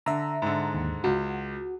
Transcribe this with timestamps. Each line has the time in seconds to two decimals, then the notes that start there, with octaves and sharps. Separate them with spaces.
0.06 D3 E5 A#5
0.42 G#2 D3
0.75 D#2
1.04 C#2 F#4